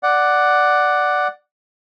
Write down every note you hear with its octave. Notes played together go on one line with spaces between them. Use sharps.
D5 F#5